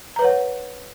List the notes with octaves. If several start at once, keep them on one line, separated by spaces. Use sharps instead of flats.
B4 C#5 F#5 A#5